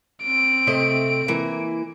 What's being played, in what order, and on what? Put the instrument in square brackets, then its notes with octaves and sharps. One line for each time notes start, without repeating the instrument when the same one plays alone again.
[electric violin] C4 D7
[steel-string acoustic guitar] C3 A3 D#5
E3 A#3